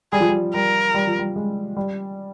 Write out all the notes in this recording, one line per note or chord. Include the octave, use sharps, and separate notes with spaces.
G3 G#4
F3
G3
G3 A#4
G3
F3
G3
G#3
G3